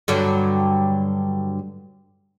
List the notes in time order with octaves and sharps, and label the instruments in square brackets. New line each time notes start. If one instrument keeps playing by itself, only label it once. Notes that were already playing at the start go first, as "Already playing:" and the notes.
[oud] G2 D3 F#3